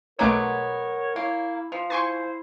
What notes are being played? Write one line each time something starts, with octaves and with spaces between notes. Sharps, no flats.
B1 F#3 G#3 A3 B3 A#4 C#5 D6
A#3 E4
F3
E4 C5 G#5 C6 C#6